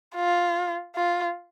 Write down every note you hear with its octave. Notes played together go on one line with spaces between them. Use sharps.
F4
F4